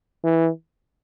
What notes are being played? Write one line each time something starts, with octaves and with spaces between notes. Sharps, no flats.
E3